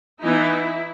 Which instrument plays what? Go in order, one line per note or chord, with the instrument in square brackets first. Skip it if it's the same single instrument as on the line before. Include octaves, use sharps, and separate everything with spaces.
[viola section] E3 B3 D#4 E4